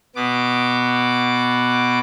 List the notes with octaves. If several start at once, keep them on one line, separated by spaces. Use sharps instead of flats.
B2 B3 D6